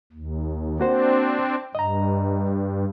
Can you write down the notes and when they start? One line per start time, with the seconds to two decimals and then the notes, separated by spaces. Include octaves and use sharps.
0.13 D#2
0.79 A#3 C4 D4 F#4 C5
1.75 G2 D#5 A#5